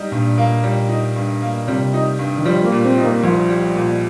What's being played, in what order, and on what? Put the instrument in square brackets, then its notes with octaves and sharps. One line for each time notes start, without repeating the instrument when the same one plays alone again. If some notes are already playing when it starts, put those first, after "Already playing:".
Already playing: [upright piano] G3 D#4
[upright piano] G2 [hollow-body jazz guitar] A#2
[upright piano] A#3
G3
D#4
G2
A#3
[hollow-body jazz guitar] C3 [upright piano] G3
[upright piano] D#4
G2
[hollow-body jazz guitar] D#3
[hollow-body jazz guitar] F3 [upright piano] G3
[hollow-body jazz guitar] A#3
[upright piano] A#2
[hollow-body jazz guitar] C4
[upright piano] D#4
[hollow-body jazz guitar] A#3
[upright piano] C2 [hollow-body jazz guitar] F3
[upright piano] G3
A#2